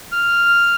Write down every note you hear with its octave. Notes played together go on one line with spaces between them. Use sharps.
F6